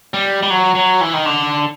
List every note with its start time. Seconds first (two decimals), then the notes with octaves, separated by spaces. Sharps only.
0.14 G3
0.43 G3
0.50 F#3
0.75 F#3
1.01 E3
1.13 D#3
1.25 D3